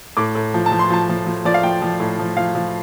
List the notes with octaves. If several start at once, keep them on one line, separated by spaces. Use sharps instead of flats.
A2 D6
A2
F3
A5
F3
C6
F3 A5
F3
F3
F3 D5
F5
F3 G5
F3
A2
F3
F3 F5
F3